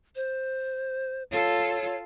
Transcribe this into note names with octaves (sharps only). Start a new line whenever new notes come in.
C5
F4 A4 C#5